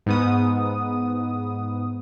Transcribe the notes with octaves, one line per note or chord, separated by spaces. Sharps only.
G#2 B3 D#6